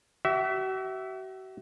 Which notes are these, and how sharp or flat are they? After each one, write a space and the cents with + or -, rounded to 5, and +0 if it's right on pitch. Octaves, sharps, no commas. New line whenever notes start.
F#4 +40 E5 +0